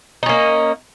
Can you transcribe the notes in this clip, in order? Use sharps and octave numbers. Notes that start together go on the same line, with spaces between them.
A#3 C#4 D#4